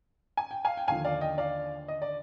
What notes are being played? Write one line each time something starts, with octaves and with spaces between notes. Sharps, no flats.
G#5
G5
F5 G#5
G5
D#2 D3 F3 F5 G#5
D5 F5
D#5 G5
D5 F5
D#5
D5